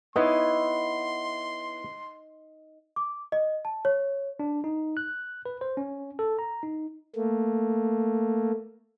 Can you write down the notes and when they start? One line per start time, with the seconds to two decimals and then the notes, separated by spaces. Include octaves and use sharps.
0.16 B3 D#4 E4 B4 C#5 D#5 C6
2.96 D6
3.32 D#5
3.65 A5
3.85 C#5
4.40 D4
4.64 D#4
4.97 F#6
5.46 B4
5.61 C5
5.77 C#4
6.19 A4
6.39 A#5
6.63 D#4
7.16 A3 A#3